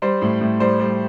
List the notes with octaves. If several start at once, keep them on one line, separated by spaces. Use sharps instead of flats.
G3 C5
A2
A2
G3 C5
G3